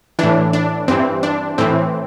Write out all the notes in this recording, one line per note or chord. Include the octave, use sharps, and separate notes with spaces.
A2 E3 D4
D4
G2 E3 C4
D4
A2 E3 C4